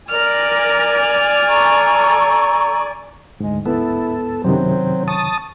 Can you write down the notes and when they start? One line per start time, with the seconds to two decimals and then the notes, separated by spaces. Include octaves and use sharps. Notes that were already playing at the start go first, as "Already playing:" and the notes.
0.10 A#4 D5 G#5 F6
1.48 A4 A#5 C#6
3.40 D2 G#2 G#3
3.66 B3 E4 A4
4.44 F#2 C3 D#3 F#3 C4
5.08 A5 C#6 D#6